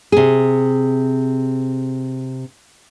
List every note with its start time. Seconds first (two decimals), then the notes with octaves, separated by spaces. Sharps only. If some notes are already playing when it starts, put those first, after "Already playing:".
0.12 C3 G#4